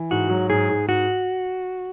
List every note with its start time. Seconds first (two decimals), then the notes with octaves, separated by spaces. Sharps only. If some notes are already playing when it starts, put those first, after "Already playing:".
Already playing: E3
0.11 G#2 F#4
0.30 F#3
0.50 G#2 G#4
0.69 G#2
0.88 G#2 F#4